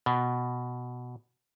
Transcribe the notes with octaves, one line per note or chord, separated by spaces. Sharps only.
B2